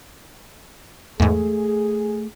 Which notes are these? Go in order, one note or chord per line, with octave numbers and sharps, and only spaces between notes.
E2 G#2 A3 G#4